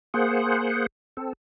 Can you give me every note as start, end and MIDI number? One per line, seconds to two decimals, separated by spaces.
0.14 0.86 58
0.14 0.86 68
0.14 0.86 72
0.14 0.86 78
1.17 1.33 60
1.17 1.33 69